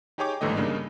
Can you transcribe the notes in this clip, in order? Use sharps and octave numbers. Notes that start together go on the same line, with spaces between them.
D#4 G4 G#4 C#5 G5 D6
G1 G#2 D3 E3 A3 D#5
G2 C#3 A#3 D4 D#4